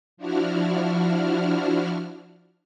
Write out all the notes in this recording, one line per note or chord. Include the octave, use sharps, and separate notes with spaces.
F3 D4 E4 F#4 F6